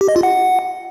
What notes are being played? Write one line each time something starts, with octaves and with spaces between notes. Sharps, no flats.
G4
D#5
F4
F#5